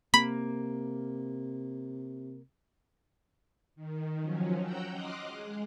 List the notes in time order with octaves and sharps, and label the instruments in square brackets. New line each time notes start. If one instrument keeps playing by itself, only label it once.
[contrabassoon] C3 [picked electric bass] A#3 [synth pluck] B5
[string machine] D#3
F3 F#3 C#4
F#5 G5 A#5 E6 F#6 G6
D#5 C6 D6 D#6 F6 F#6
G#3